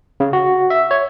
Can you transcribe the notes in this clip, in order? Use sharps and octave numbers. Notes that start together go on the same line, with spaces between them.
C#3
F#4
E5
C#5